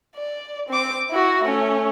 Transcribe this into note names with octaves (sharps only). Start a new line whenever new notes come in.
D5
C4 D6
E4 F#4
A3 C#4